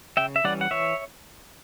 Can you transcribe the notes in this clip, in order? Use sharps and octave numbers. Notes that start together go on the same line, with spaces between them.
C#3 E5 G5
E5
E3 G3 C#4 D5 F#5
F#5
E3 C#5 E5